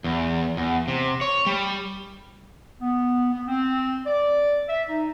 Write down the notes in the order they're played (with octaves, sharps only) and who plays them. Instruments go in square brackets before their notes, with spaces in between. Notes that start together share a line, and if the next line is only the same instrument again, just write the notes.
[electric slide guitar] E2
E2
C3
C#5
G3
[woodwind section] B3
B3
C4
D5
E5
D#4